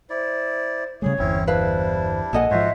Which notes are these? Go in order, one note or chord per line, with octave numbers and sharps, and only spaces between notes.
E4 C5 D5
C#3 G3 A3 G#4 C#5
G1 E2 C4 C#4 E4
G3 D4 E4 B4 C5 F5
A#1 A#3 A4 D#5 F#5 G#5
G#2 F3 F#4 C5 C#5 E5